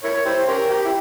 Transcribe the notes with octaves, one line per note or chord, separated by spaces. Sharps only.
E4 A#4 C#5
E4 G4 C5
C#4 G4 A#4
G4
E4